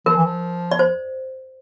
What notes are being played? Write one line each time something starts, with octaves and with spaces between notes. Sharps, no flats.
F3 A#4
E3
F3
D5
C5